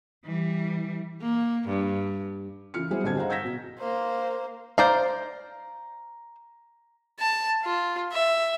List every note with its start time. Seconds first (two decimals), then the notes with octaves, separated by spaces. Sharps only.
0.24 E3 G3
1.21 A#3
1.68 G2
2.74 C#3 E3 F4 F6 C#7
2.90 F#3 G3 B3 E4 G#4 C5
3.03 B1 G2 D3 C4 A5 G#6
3.16 G#4 C5 D#5 F5 F#5 A#5
3.30 E6 G6 G#6 A#6 B6 E7
3.44 B2
3.79 A#3 C5
4.78 C5 D5 F5 A#5
7.20 A5
7.64 F4
8.12 E5